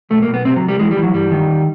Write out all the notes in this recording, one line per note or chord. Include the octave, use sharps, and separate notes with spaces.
B1 A3
A#3
B1
B3
C3 C4
F#3
C2
G3
E3 G#3
G3
E3
F#3
G2 G3
D#3
D#2